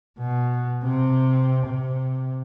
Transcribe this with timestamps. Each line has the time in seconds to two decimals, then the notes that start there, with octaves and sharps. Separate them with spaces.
0.19 B2
0.83 C3 C4
1.66 C3